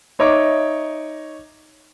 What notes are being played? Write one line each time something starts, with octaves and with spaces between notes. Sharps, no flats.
D#4 C#5 D#5 E5 D6